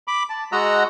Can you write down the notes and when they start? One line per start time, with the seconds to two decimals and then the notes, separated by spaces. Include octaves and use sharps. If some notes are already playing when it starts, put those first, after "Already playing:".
0.08 B5 D6
0.29 A5
0.52 G#3 F#4 D#5 F#5 A#5 E6